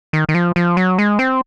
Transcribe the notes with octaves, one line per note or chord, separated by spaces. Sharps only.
D#3
D#3
F3
F3
F#3
G#3
C4